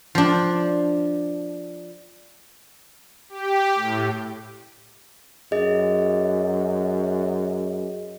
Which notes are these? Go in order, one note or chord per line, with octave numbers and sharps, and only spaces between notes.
F3 D4
G4
A2
F#2 G#4 D#5